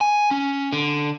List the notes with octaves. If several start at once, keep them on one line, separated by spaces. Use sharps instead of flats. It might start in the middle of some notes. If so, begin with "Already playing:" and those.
G#5
C#4
D3